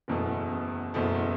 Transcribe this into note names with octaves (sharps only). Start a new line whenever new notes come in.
F#1 E2 B2 A3
F#1 E2 B2 A3